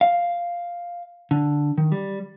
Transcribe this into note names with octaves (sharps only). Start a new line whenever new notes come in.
F5
D3
D#3
G3